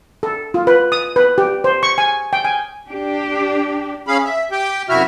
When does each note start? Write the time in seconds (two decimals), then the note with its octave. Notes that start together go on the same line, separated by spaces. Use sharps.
0.23 A4
0.54 F4
0.67 B4
0.92 D#6
1.16 B4
1.38 G4
1.64 C5
1.83 C#6
1.98 G#5
2.33 G5
2.45 G#5
2.89 D4 G4
4.07 C#4 G#4 F5 B5
4.24 E5
4.51 G4 G5
4.89 F#2 C3 E4 F#4 E5 F6